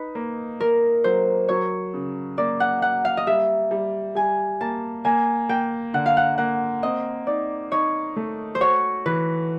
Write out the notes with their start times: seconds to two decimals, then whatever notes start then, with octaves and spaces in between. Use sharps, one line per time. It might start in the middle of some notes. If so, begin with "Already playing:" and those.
Already playing: D#4 B4
0.15 A#3
0.60 A#3 A#4
1.04 F#3 C5
1.49 F#3 C#5
1.94 C#3
2.38 A#3 D5
2.60 F#5
2.82 A#3 F#5
3.05 F5
3.17 D#5
3.27 G3 E5
3.71 G3
4.15 G3 G#5
4.61 A#3 A5
5.05 A#3 G#5
5.49 A#3 G5
5.94 D3 F#5
6.06 F5
6.17 F#5
6.38 A#3 F#5
6.82 C4 D#5
7.27 D#4 D5
7.72 D#4 C#5
8.16 A3
8.55 C5
8.61 F#4 C#5
9.06 E3 B4